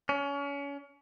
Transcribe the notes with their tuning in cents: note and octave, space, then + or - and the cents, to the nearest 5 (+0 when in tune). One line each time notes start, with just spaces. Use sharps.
C#4 +30